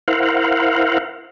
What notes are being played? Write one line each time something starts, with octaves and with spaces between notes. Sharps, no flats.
E4 A#4 C5 F5 F#5